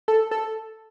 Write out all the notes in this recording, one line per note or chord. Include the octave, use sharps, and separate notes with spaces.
A4
A4